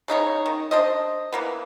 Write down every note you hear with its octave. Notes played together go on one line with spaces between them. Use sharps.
C#3 D#4 E4 C#5
D#3
D4 C5 D#5
E3 A#3 B3